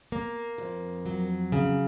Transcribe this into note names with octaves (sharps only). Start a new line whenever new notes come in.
A#3
F2
F#3
C#3